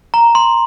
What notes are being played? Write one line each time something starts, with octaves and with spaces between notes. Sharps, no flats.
A#5
C6